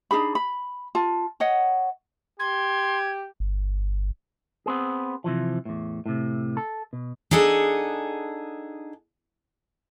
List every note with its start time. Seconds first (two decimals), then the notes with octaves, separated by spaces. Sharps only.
0.11 D4 D#4 G#4 B5
0.35 B5
0.95 F4 A5
1.40 C#5 D#5 F#5
2.40 G4 C6 G#6
3.40 G1
4.66 B3 C4 G#4
5.24 C3 E3 F3
5.65 E2 A2
6.06 A2 C3
6.57 A4
6.93 B2
7.31 D4 D#4 G#4 A4 F#5